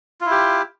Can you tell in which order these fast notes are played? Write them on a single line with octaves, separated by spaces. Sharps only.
F4 E4 G4